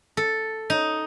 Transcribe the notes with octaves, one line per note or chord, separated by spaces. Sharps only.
A4
D#4